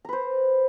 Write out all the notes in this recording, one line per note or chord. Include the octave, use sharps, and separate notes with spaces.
B4 C5 A#5